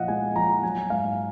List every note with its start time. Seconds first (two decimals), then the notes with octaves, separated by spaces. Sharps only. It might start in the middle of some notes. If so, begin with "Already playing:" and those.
Already playing: A#2 F3 D#5 F5 F#5
0.08 G#3 G#5
0.36 F3 A#5
0.63 F#3 G#5
0.90 G#2 F5